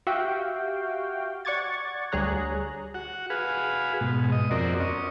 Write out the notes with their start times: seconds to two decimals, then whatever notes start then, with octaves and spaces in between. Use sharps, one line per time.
0.07 F#4 G4 E5 F5 G5
1.45 D5 F#5 C#6 D6 G#6 A6
2.12 D2 G3 G#4 C#5 A#5 F#6
2.94 F#4 F#5
3.30 F#4 G#4 B4 F5
4.01 G#2 B2
4.32 D#5
4.51 F2 C4 F#4 A#4 D5
4.80 C#4 D#5